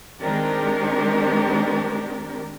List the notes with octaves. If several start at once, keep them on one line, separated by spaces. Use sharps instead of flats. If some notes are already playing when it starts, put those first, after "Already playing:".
D#3 G#3 C4 D4 G4 A#4